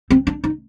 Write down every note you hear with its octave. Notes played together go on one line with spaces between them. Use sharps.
C4
D4
D#4